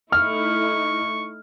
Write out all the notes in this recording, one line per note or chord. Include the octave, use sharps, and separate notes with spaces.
A3 D#4 E4 C#6 F6